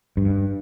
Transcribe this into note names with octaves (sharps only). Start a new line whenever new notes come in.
G2